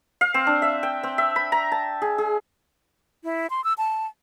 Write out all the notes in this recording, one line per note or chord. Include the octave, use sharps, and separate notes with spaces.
F5
C4
D4
E5
G5
C4
E5
B5
A#5
A5
G#4
G#4
E4
C6
E6
A5